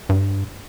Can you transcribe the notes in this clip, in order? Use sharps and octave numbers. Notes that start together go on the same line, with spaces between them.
G2